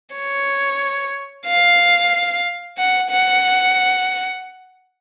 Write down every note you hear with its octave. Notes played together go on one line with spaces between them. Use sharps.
C#5
F5
F#5
F#5